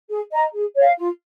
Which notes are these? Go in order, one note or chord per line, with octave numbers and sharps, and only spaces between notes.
G#4
D#5 A#5
G#4
C#5 F5
F4